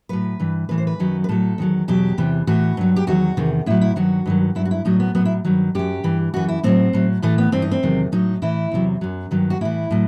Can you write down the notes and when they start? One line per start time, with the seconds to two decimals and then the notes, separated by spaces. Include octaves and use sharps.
0.09 A2 F#3 B4
0.40 G2 E3
0.69 A2 E3 B4
0.78 C5
0.87 B4
0.99 F#2 D#3 F#3
1.24 B4
1.29 A2 F#3 A4
1.58 E2 D#3 F#3
1.88 E2 B2 F#3 G4
2.18 E2 C3 E3
2.47 A2 E3 F#4
2.77 G2 F#3
2.96 G4
3.07 E2 D#3 F#3 F#4
3.37 E2 C3 D#3
3.66 A2 F#3 E4
3.81 E4
3.96 G2 D#3 F#3 F#4
4.26 G2 D#3 F#3
4.55 G2 F#3 E4
4.65 F#4
4.71 E4
4.85 A2 F#3 D#4
5.00 B3
5.15 A2 F#3 B3
5.25 E4
5.45 G2 D#3 F#3
5.75 F#2 F#3 G4
6.04 G2 E3
6.34 F#2 E3 F#4
6.49 E4
6.63 A2 F#3 C4
6.93 A2 F#3
7.22 A2 E3 A3
7.38 B3
7.52 G2 E3 C4
7.62 D#4
7.71 C4
7.83 E2 C3 D#3 F#3
8.12 A2 F#3 D#4
8.42 A2 E3 E4
8.72 E2 C3 F#3
9.01 F#2 F#3
9.31 G2 D#3 F#3
9.50 F#4
9.61 A2 E3 E4
9.91 A2 F#3